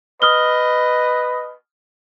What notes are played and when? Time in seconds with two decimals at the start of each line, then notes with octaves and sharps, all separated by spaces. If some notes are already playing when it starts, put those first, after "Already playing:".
0.22 B4 D#5 D#6 F6 G7